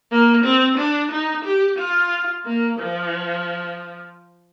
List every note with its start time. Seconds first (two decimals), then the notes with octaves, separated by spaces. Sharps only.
0.11 A#3
0.44 C4
0.78 D4
1.11 D#4
1.45 G4
1.79 F4
2.45 A#3
2.79 F3